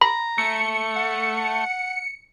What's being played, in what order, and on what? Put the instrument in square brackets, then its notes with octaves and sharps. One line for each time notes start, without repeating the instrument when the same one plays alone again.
[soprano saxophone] A#5 [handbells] B5
[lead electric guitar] A3 [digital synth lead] C#7
[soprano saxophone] F#5